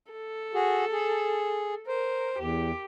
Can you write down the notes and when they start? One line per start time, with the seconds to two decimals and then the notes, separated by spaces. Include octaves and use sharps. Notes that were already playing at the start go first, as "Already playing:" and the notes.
0.12 A4
0.54 F#4 G#4
0.92 G#4
1.88 A#4 C5
2.39 E2 G4